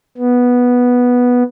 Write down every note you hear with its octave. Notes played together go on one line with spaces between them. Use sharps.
B3